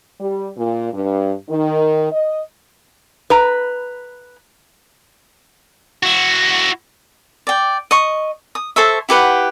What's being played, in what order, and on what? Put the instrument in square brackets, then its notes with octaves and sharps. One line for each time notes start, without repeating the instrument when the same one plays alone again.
[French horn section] G3
A#2
G2
D#3
D#5
[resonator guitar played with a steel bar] B4 A#5
[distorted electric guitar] E4 F#4
[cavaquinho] D5 G5
D#5 C#6
D#6
A4 C5 C#5 E5
E4 G4 B4 F#5